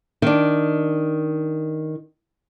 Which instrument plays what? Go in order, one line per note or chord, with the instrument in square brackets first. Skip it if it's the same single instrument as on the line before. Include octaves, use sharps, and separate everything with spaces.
[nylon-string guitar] D#3 D4